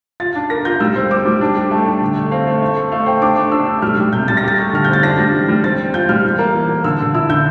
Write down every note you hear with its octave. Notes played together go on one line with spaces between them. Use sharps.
F4 A6
D4
A#4 A#6
F4 G6
G3 E6
C5
C5 D6
G3
D4
G4
A3 A5
D4
D3
A3
C4 F5
A3
A3
A4
A3 F5
C5 G5
D4 D6
A3
D4 E6
D4
G3 F6
G3
C3 G6
G3 A6
A#6
G4 A6
A3
D3 F6
C4 G6
A6
D4 A#6
G3
E3
G3
C4 A6
C4
F4 G6
G3 F6
E3
A#3
E3
A#3
D3 E6
D3
E4 E6
D3 G6